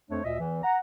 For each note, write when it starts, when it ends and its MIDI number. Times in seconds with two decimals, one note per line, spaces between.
0.10 0.19 41
0.10 0.19 57
0.10 0.19 62
0.10 0.19 72
0.10 0.19 73
0.24 0.36 38
0.24 0.36 46
0.24 0.36 75
0.24 0.36 76
0.40 0.62 40
0.40 0.62 52
0.64 0.77 78
0.64 0.77 82